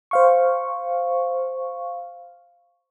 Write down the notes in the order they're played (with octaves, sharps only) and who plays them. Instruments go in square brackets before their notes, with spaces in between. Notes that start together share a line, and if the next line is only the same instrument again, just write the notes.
[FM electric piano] C5 F5 C#6